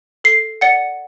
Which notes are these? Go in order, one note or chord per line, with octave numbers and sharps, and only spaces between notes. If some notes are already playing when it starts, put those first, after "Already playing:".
A4 C7
D5 F#5 C#7